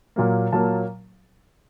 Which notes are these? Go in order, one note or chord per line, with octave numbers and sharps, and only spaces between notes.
A#2 F#3 A#3
A#2 F#3 A#3 A5